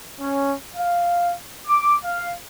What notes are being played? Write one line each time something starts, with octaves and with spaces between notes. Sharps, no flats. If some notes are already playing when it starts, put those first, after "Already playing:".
C#4
F5
D6
F5